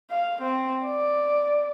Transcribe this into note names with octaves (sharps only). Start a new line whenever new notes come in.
F5
C4
D5